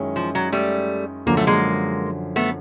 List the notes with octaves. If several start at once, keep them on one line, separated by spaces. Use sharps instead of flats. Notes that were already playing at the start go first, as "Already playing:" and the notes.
Already playing: F#2 D#3 G#3 C#4 E4
F3
F#3
G3 A3
F#2 D3 F3 A#3
A3
G#3 A#3
A3 B3